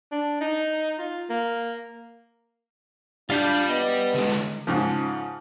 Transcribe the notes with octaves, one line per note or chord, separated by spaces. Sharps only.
D4
D#4
F4
A#3
G3 D4 F4 F5 G6
B3 D#5
D3 G#3
G#2 C#3 F3